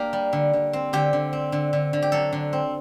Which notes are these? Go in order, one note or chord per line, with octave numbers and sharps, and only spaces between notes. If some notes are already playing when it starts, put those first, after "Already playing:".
Already playing: A#3 D4 G4
G3
D3
D3
C4
D3 G4
D3
C4
D3
D3
D3
G4
F#3 A4
D3
C4